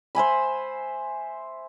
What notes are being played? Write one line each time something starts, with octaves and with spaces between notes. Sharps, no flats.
C5 E5 G#5 B5